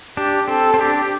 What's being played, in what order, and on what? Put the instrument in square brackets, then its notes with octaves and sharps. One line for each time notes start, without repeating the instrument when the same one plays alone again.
[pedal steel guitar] D4 [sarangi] G4
[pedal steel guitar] C4 [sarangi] A4
[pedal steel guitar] C4
[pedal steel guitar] D4 [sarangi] G4